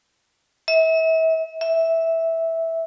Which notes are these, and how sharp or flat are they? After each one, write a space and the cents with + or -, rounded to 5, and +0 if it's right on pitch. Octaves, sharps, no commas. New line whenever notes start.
E5 -35
E5 -10